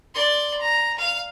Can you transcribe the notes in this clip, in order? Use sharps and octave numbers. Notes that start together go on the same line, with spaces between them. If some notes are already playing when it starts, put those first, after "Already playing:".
D5 C6
A#5
F5